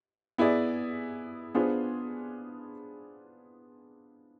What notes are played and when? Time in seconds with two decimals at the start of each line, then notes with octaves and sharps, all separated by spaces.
0.38 B3 E4 G#4 D5
1.55 B3 D4 F4 G#4 C5